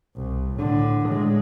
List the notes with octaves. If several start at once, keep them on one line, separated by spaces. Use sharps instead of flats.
C2
A2 D3
A2 G#3